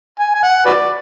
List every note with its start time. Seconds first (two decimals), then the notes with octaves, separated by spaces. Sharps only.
0.19 G#5
0.35 G#5
0.43 F#5
0.66 F#4 B4 D5